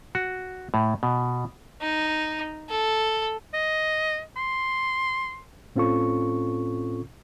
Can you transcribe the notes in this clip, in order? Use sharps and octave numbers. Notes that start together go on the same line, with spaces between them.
F#4
A2
B2
D#4
A4
D#5
C6
A2 C4 C#4 F4 A4 C#6